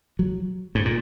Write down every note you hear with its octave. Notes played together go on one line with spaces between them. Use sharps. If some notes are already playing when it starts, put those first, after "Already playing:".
F#3
G#2
A#2